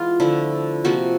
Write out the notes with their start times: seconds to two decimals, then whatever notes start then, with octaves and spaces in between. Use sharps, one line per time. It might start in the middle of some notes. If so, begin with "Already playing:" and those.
Already playing: E3 G#3 B3 F4
0.20 D3 F3 A3 E4
0.85 C3 F3 A#3 F#4